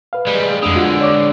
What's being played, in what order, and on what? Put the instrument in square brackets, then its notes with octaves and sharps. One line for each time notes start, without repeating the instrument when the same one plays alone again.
[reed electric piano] B4 F5
[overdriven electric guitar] G3 G#3
[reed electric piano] F2 D#6 [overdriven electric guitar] D3 G#3
[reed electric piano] F4 F#4
C#5 D5 D6